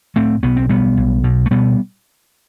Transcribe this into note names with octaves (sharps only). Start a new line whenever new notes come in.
A2 A3 C4
B1 B3
C4
B2 G3 B3
B1
B2
A3
B2 G3 B3